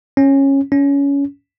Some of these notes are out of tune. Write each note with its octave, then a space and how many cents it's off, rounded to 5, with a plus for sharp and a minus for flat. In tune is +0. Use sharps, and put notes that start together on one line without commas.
C#4 -15
C#4 +20